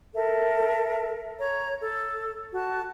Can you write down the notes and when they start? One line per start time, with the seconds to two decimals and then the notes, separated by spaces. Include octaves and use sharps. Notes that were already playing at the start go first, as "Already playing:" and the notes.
0.14 A4 A#4 E5
1.39 C#5 A#5
1.81 A4
2.52 F#4 A5